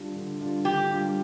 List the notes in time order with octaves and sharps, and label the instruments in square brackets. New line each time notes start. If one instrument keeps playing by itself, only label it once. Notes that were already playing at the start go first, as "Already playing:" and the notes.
Already playing: [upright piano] D3 G3 D4 F4
D3
G3 D4 F4
[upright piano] D3 [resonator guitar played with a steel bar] G4
[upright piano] G3 D4 F4